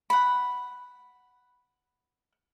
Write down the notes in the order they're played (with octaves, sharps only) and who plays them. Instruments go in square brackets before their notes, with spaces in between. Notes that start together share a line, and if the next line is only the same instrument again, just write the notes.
[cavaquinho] F#5 B5